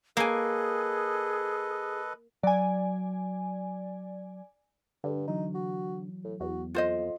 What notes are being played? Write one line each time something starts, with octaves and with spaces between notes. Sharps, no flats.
A#3 G#4 A4 B4 D#5 G#5
F#3 D5 G#5
G2 D3
E3 F#3 D#4
F#4
A2
E2 F#4
F2 F4 C5 D#5